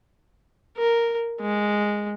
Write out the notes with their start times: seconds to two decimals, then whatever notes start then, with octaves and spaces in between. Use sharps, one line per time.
0.78 A#4
1.41 G#3